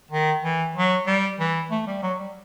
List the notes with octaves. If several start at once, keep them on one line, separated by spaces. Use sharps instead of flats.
D#3
E3
F#3
G3
E3
A3
G3
F#3
G3